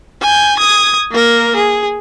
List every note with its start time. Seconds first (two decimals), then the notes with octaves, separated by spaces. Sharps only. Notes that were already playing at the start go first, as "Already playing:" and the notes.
0.22 G#5 G6
0.57 D#6 G#6
1.12 A#3 A#4
1.56 G#4